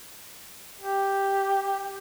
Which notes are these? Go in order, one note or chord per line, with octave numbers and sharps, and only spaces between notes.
G4